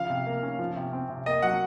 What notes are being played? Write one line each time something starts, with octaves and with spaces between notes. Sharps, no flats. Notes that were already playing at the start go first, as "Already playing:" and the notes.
Already playing: C#3 F3 F5
C3
A#3
C#4
F3
C3
C4
C3
A#3 D#5
F#3 F#5